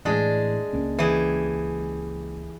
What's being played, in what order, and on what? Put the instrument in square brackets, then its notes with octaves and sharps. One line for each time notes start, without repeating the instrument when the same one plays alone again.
[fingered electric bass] A2 E3 [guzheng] G#3 D4 G#4
[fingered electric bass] C#2 A#3 C#4
[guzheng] E3 G4 G#4